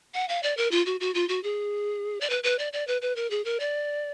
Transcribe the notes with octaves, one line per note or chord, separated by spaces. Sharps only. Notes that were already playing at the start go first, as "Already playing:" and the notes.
F#5
F5
D5
A#4
F4
F#4
F#4
F4
F#4
G#4
D5
B4
B4
D5
D5
B4
B4
A#4
G#4
A#4
D5